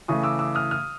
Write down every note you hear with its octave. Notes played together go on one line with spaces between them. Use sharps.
C#3 E3 A3 C#6 D#6
D6 E6
D6 E6
D#6 F6
D#6 F6